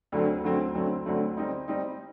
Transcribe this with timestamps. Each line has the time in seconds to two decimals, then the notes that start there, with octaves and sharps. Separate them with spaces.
0.12 D2 D3 F#3 A3 C4
0.44 D2 D3 F#3 A3 C4
0.75 D2 D3 F#3 A3 C4
1.06 D2 D3 F#3 A3 C4
1.37 G3 C4 D#4
1.68 G3 C4 D#4